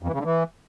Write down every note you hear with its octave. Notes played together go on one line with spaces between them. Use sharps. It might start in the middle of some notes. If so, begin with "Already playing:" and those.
F2
E3
C#3
D3
E3